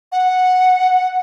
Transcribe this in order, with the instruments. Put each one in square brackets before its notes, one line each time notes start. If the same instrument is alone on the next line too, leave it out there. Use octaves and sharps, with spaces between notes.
[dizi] F#5